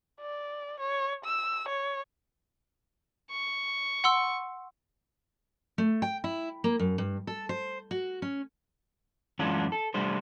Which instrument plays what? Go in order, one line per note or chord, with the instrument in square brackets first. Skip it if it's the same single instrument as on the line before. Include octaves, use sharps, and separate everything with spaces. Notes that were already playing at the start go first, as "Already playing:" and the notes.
[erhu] D5
C#5
E6
C#5
[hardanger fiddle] C#6
[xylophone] F#5 C6 E6
[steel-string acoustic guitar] A3
G5
E4
A#3
F#2
G2
A4
C5
F#4
C#4
[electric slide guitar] F#2 E3 G#3 C#4 D4 F4
A4
G3 A3 D4 C5